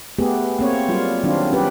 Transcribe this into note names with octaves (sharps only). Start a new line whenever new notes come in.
A3 B3 G4 G#4
A#3 C4 C#5
F#3 G3 F4
D#3 F#3 C4 D4 F4
C#4 G4 B4